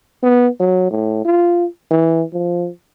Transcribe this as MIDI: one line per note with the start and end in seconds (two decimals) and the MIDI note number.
0.23 0.49 59
0.60 0.89 54
0.91 1.25 45
1.25 1.66 65
1.91 2.24 52
2.33 2.69 53